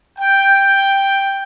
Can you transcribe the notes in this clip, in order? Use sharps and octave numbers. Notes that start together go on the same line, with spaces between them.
G5